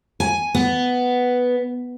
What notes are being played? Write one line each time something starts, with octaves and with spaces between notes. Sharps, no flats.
G#5
B3